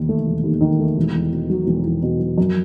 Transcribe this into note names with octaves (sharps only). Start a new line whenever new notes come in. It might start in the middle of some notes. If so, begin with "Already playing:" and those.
Already playing: E1 D#2 D#3
A3
E1
D#2
D#3
A3
E1
E2
B2
F#3
E1
E2
B2
F#3
F#2